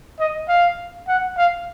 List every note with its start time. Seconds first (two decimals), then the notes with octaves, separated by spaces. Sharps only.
0.20 D#5
0.49 F5
1.08 F#5
1.37 F5